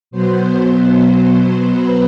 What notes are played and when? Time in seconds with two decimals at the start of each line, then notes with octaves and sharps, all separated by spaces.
0.11 B2 F#3 B3 C5
0.65 C5
1.19 C5
1.73 B4